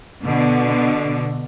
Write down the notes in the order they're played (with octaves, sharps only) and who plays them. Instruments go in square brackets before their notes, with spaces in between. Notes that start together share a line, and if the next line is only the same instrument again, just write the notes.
[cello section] B2 D3